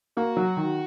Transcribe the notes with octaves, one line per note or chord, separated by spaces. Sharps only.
A#3 F#4
F#3
D#3